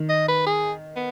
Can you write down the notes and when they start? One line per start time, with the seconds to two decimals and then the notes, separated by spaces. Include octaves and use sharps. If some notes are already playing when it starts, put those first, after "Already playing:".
Already playing: D#3
0.09 D#5
0.28 B4
0.46 G#4
0.96 B3